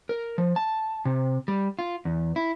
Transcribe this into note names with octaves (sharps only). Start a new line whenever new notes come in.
A#4
F3
A5
C3
G3
F4
E2
E4